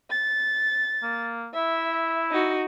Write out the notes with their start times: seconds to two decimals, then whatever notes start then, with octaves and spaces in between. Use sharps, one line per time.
0.10 A6
1.03 A#3
1.55 E4 E5
2.31 D#4 F#4